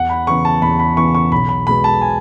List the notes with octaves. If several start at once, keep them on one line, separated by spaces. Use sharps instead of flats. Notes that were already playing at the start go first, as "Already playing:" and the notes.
Already playing: E2 F#5
B5
C#3 E3 B3 C#6
A5
E2 B5
B5
C#3 E3 B3 C#6
C#6
B1 B5
B5
B2 G#3 B3 B5
A5
G#5